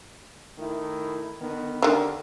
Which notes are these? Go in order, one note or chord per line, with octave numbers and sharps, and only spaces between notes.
D#3 A3 E4
D3 D#3 B3
D3 D#3 D4 G4 A#4